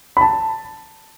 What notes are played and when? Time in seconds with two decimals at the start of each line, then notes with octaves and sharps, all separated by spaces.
0.17 B5
0.21 A5